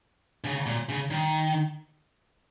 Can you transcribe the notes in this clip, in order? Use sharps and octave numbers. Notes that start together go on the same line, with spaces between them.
C#3
A#2
C#3
D#3